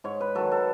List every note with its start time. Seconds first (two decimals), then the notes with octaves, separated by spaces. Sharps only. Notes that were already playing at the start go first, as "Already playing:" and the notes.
0.04 G#2 C#5
0.21 B4
0.35 D#3 F#3 A4
0.51 A4